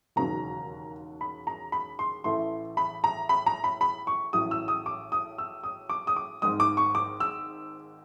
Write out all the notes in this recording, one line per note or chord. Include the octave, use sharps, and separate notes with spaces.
E1 D#2 C#3 F#3 A#5
B5
A#5
B5
C6
A1 A2 E3 A3 C6
B5
A#5
B5
A#5
B5
B5
C#6
A1 A2 F#3 D#6
E6
D#6
D6
D#6
E6
D#6
D6
D#6
D6
G#1 G#2 D#3 G#3 D#6
D6
C#6
D6
E6